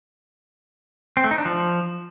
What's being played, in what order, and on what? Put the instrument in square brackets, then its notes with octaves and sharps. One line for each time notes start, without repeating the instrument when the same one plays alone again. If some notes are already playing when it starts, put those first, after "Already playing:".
[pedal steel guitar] C4
A3
D#4
D4
F3